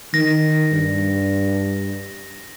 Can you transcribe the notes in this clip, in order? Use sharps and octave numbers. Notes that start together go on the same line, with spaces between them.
D#3 A#6
G2